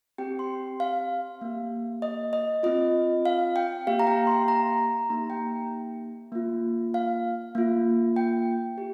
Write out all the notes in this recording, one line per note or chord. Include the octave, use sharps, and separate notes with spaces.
C4 G4 G5
C6
F5
A#3 G4
D#5
D#5
C4 F4 D#5
F5
G5
A#3 G4 F5
A#5
G5
C6
A#5
A#3 D#4 G4 A#5
G5
A#3 F4
F5
A#3 F4
G5
G4